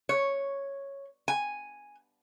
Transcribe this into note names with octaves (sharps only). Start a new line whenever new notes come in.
C#5
G#5